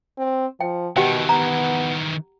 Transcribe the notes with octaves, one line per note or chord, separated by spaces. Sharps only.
C4
F3 G5
B2 D#3 E3 G4 F#5 G5
B3 A#5